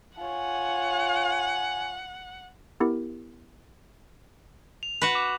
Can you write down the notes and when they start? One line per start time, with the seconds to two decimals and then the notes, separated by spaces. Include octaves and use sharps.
0.18 F4 C#5 F#5 G#5
2.80 B3 E4 G4 A#4
4.83 F7
5.01 F#4 B4
5.15 D6